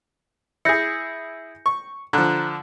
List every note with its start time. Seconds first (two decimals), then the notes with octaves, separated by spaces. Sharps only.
0.65 E4 G#4 G6 A#6 C#7
1.66 C#6
2.13 D3 F3 A#5 F#6